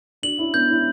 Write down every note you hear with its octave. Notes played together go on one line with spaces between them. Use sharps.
D4 F#4 F#7
C#4 E4
B3 D4 G6
C#4 E4